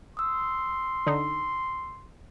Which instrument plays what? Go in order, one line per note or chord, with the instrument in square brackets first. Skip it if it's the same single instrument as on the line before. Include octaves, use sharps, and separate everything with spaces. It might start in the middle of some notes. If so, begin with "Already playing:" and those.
[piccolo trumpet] C6 [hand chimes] D#6 E6
[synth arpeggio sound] D3 D#4